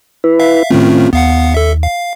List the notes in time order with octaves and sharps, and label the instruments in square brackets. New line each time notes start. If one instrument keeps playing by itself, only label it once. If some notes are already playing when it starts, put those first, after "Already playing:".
[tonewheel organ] E4 B4
[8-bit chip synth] E5 F5
[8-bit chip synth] A2 D#3 A3 [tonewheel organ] C4 C#4 F4
[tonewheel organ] D#2 [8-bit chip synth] B3 F5 F#5
[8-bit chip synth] A4 E5
F5